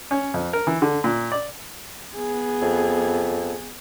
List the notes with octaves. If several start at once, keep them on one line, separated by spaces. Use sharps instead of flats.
C#4
F2
A#4
E3
D3
A#2
D5
B3 G#4
F2